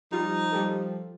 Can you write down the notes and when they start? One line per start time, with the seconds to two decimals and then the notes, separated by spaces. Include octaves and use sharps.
0.12 F3 G3 D#4 F4
0.52 G3 G4 A4